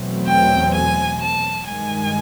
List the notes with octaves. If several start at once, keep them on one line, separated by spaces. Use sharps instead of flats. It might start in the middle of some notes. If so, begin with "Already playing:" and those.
Already playing: E2 B2 F#3 A3 C4
G5
G#5
A5
G2 D#3 G#3 G#5